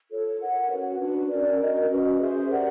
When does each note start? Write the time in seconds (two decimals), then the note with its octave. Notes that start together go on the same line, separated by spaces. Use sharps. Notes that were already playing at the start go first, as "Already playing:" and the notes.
0.10 F4 A4 C#5
0.40 A#4 C#5 F#5
0.70 C#4 F#4 B4
0.99 D4 F#4 B4
1.29 C#4 F#4 A#4 D5
1.59 F#4 A#4 D#5
1.88 C#4 F#4 B4 D#5
2.18 G#4 C5 E5
2.49 G4 A#4 D5 F#5